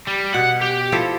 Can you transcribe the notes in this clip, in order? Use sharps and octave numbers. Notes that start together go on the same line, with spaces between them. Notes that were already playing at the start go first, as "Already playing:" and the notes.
G3
B2 F#5
G4
F3 E4 A4